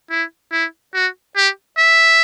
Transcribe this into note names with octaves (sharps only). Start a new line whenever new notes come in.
E4
E4
F#4
G4
E5